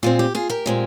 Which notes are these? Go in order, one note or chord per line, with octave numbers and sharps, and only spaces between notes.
A#2 G#3 C4 F4
G4
F4 G#4
G4 A#4
A#2 G#3 C4